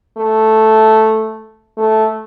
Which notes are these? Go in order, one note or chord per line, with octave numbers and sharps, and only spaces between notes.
A3
A3